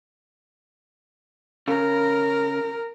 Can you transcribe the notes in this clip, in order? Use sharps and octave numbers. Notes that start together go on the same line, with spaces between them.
C#3 A#4